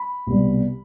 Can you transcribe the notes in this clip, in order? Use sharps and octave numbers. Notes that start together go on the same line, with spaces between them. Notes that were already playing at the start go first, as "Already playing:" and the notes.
Already playing: B5
C2 B2 G3